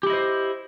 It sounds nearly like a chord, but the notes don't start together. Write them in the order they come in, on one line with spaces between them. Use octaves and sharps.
G4 E4 D#5 C5